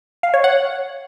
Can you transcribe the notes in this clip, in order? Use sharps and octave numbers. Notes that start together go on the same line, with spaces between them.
F5
C#5
F#5